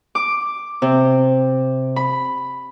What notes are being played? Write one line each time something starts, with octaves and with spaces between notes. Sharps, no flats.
D6
C3
B5